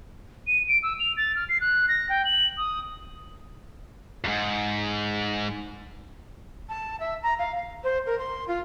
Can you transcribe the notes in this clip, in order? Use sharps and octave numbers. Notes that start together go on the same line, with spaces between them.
D#7
D7
E6
F7
A6
F6
C7
F#6
A#6
G5
F#7
D#6
F2 G#2
A5
E5
A#5
F5
F5
C5
A#4
C6
F4